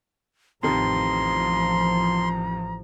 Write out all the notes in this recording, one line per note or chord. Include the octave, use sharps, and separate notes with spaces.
A1 F2 C3 D#3 F3 A#5 C6